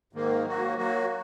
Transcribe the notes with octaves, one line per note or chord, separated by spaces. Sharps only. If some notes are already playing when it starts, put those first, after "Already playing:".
G#2 D#3 A#3
F#3 A#3 F#4
F#3 A#3 F#4